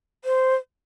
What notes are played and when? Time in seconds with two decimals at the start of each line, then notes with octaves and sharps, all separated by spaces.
0.25 C5